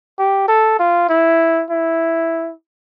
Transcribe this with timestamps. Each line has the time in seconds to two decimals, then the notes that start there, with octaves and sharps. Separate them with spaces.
0.19 G4
0.48 A4
0.79 F4
1.09 E4
1.70 E4